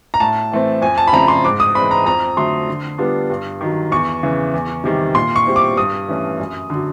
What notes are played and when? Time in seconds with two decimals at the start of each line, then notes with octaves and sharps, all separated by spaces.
0.14 A#5
0.20 A2 A5
0.52 E3 A3 C4
0.81 F2 G#5
0.98 A5
1.07 B5
1.13 C#3 F3 A3 C4 A#5
1.28 C6
1.44 G#2 D6
1.60 D#6
1.75 E3 G#3 C4 B5
1.91 A#5
2.06 F2 A#5
2.37 D3 F#3 A3 C6
2.68 D3
2.98 G3 B3 D4 F4
3.30 G2
3.61 D#3 F#3
3.92 E2 C#6
4.23 C#3 E3
4.54 E2
4.84 C3 D#3 G3
5.15 A#2 C6
5.36 C#6
5.46 G3 C4 E4
5.56 D6
5.77 G2 D#6
6.09 E3 A3 C#4
6.39 F#2
6.70 D3 F#3